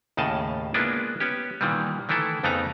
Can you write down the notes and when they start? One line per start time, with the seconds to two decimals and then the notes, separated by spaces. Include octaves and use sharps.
0.17 D#2 A2 C#3 D#5 A5
0.74 G#3 A#3 B3 D4 E4 F4
1.20 B3 C#4 G4
1.61 A#2 D#3 E3 G3
2.09 D#3 E3 A3 E4 A4
2.44 F2 C#3 A3 B3 D#4 A#5